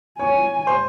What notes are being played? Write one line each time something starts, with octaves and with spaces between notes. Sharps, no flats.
C#5 G#5 C#6
C5 C6